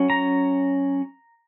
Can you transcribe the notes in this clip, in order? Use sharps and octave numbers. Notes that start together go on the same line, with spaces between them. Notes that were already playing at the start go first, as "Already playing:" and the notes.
Already playing: F#3 C#4
A#5